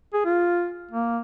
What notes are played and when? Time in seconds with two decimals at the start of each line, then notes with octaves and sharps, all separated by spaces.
0.14 G#4
0.25 F4
0.91 A#3